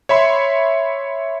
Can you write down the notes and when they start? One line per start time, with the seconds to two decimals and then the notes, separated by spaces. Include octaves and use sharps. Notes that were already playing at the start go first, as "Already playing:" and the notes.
0.09 C#5 E5 B5 C6